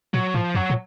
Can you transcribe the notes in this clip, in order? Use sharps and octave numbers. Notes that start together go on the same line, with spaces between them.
A#2 F#3
A2 F3
F#2 F#3
A#2